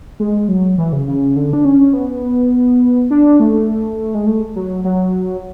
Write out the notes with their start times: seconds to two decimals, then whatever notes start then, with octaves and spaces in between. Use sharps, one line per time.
0.20 G#3
0.48 F#3
0.78 E3
0.93 C#3
1.07 C#3
1.36 D3
1.53 D4
1.65 C#4
1.93 B3
3.11 D4
3.40 A3
4.14 G#3
4.26 A3
4.56 F#3
4.84 F#3